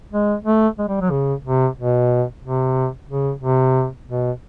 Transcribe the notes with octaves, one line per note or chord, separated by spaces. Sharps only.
G#3
A3
G#3
G3
F#3
C#3
C3
B2
C3
C#3
C3
B2